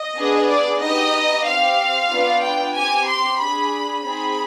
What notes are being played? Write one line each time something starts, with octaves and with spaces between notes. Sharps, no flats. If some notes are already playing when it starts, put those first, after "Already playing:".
Already playing: D#5
B3 D4 G#4
D5
B3 D#4 G4 D#5
C4 G4 F5
B3 D4 F4
G5
C4 G4 G#5
C6
D4 G#4 B5
C4 D#4 G#4 B5